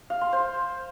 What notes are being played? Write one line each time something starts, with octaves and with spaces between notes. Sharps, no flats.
F5
C6
C5